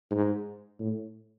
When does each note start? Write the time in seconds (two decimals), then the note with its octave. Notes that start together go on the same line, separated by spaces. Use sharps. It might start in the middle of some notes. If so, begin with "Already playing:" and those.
0.11 G#2
0.80 A2